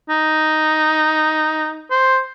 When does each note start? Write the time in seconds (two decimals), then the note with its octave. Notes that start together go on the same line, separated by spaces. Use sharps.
0.09 D#4
1.90 C5